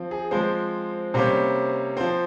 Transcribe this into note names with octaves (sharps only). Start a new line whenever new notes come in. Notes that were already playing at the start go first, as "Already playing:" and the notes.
Already playing: F3 C4
G#4
F3 G#3 C4 C5
C3 G3 A#3 C#4 C5
F3 C4 C5